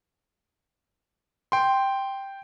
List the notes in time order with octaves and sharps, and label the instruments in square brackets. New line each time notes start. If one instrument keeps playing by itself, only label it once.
[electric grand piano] G5 C6